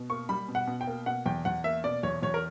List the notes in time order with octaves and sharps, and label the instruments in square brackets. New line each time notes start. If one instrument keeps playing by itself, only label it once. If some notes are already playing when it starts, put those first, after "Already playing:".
Already playing: [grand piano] B2
A#3 C#6
G3 B5
B2
F#5
B2
G5
A#3
B2 F#5
E2 G5
E2 F#5
A#3 E5
B2 D5
E2 C#5
E2 C#5
A#4